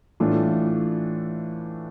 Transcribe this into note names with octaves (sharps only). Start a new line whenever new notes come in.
A2 E3 A3 D4 F4